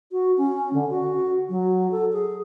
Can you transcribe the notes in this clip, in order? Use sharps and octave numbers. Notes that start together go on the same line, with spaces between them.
F#4
C#4
D3
F#4
F#3
A4
G#4